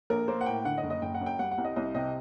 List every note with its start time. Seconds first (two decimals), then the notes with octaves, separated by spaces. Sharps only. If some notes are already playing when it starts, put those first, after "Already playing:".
0.10 A#1 A#4
0.28 A#3 C5
0.41 F#5
0.46 A2 G5
0.65 D3 F#5
0.78 D#5
0.83 F#1
0.90 D#5
1.02 F#1 G5
1.14 F#5
1.21 F#2
1.26 G5
1.39 G3 F#5
1.51 F#5
1.58 C2
1.64 D#5
1.76 C2 D#5
1.95 C3 D#5